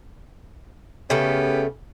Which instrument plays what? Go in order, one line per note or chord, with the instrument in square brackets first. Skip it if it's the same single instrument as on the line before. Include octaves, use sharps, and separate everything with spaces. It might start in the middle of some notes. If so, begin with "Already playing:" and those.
[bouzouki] C#3 A3 [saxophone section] B3 C#4 G4